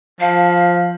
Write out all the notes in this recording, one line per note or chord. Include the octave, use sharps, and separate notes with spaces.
F3 F5